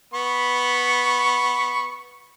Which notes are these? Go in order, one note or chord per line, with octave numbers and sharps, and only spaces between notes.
B3 B5 C#6